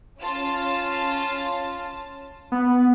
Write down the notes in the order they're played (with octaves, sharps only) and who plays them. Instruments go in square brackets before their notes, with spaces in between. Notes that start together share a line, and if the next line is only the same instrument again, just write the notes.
[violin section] C#4 F4 A5
[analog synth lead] B3